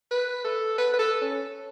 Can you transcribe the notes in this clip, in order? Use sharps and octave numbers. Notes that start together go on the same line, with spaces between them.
B4
A4
B4
B4
A4
C#4